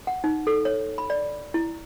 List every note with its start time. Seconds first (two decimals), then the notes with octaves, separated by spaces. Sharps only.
0.07 F#5
0.24 D#4
0.47 A4
0.65 C#5
0.98 B5
1.10 D5
1.54 E4